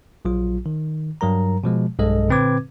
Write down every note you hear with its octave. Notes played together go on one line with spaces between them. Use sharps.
A#1 F#3 F4
D#3
G2 F#3 A#4 A#5
B2 F3 G#3
B1 G2 G#3 A4 D#5
A#2 D3 C4 B4 D6 G#6